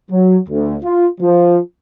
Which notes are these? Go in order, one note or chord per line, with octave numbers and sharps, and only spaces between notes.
F#3
D2
F4
F3